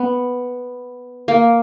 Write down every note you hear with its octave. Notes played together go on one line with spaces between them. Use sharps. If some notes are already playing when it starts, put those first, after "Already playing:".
Already playing: B3
A#3